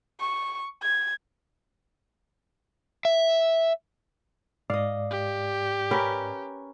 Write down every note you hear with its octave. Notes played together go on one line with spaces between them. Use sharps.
C#6
G#6
E5
G#2 D5 D#5 F5
G4
C#4 A#4 B4